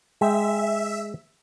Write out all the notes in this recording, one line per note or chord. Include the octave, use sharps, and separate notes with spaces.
G#3 E5 G5